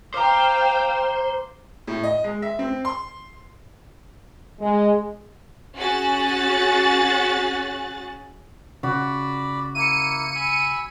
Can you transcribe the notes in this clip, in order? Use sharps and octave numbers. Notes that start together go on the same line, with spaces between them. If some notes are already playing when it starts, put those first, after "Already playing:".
C5 F5 G5 A#5 D6
A2
D#5
G#3
E5
C4
C6
G#3
C#4 F#4 G#4 F#6 A6
C#3 F#4 D5 B5
A#3 E4 C#7 D#7
G#5 B5 E6